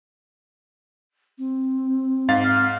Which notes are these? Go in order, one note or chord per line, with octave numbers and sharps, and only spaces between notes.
C4
G#2 F5 A6
F6